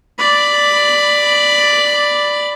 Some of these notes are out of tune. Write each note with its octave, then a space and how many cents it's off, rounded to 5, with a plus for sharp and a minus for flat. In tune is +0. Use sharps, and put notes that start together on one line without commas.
D5 +0 B5 +5